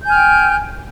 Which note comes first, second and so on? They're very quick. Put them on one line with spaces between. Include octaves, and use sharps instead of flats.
G6 G#5 F6 G5